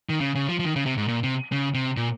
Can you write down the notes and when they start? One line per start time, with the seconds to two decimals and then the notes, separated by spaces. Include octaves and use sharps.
0.09 D#3
0.21 C#3
0.35 C#3
0.49 F3
0.59 F3
0.64 D#3
0.76 C#3
0.86 C3
0.97 G#2
1.08 A#2
1.23 C3
1.52 C#3
1.74 C3
1.97 A#2